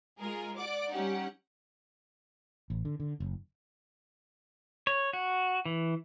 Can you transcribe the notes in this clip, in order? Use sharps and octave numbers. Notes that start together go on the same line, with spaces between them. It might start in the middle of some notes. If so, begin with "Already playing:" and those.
G#3 F4 G#4 A#4
D5 F#5 D6
G3 C#4 D#4 G4 F#5
A1
D3
D3
F#1
C#5
F#4
E3